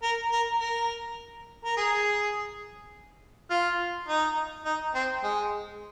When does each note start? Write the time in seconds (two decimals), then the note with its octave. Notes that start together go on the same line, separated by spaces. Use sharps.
0.03 A#4
0.32 A#4
0.60 A#4
1.65 A#4
1.77 G#4
3.50 F4
4.08 D#4
4.65 D#4
4.95 C4
5.24 G#3